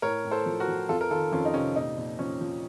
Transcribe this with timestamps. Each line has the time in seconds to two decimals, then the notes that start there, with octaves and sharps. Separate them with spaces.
0.02 A2 A#4 C#5
0.24 A2
0.31 A4 C5
0.46 F3
0.60 F#4 A#4
0.68 F3
0.89 F2 F4 A4
1.01 A#4
1.11 D#3 F4 A4
1.32 F2 C#4 F4
1.45 D#4
1.54 C3 C#4
1.75 A#2 D#4
1.97 A#2
2.19 F3 C#4
2.41 F3